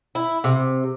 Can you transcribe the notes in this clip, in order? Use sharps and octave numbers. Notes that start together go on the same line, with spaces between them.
E4
C3